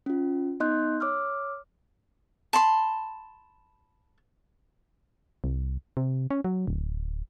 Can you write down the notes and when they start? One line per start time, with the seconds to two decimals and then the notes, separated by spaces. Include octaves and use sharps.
0.06 C#4 F4
0.60 B3 D#4 D#5 C6 F#6 G6
1.00 C#5 D6 E6 F6
2.53 A5 B5 C6
5.44 C2
5.97 C3
6.31 C#4
6.44 F#3
6.67 D1